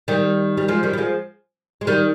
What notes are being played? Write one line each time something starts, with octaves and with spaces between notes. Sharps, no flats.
D#3 G3
G3
F3 G#3
D#3 G3
G3
F3 G#3
G#3
D#3 G3